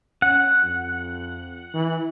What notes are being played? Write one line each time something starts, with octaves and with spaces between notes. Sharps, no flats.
C#4 F#5
F2
E3